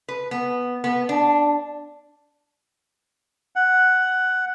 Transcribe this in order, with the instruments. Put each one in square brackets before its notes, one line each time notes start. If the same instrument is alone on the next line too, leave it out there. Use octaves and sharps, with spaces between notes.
[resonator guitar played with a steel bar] B4
B3
B3
D4
[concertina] F#5